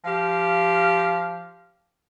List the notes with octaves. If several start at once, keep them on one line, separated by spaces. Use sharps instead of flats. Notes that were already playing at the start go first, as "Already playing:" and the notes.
F3 G4 F5